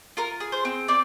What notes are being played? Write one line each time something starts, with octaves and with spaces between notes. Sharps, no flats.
F4 A#4
G#4
C5
C4
C4 D5